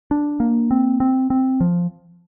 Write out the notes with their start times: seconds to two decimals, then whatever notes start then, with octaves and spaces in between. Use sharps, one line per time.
0.11 D4
0.40 A#3
0.71 C4
1.00 C4
1.30 C4
1.61 F3